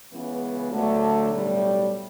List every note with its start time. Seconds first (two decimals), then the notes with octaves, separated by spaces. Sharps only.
0.11 C#2 C#3 E3 B3
0.71 D2 D3 F#3 A3
1.30 B1 A2 G3